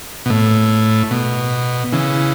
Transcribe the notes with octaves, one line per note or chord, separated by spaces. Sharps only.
B2
A2
B2
C#3 E3